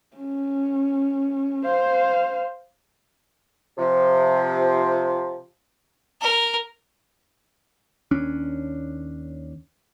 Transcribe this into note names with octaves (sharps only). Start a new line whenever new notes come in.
C#4
C5 F5
C3 F3
A#4
D#2 C#4 D4